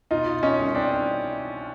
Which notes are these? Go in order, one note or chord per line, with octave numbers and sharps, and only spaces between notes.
B2 D#4 F4
C#4 D#4
C2
C4 D4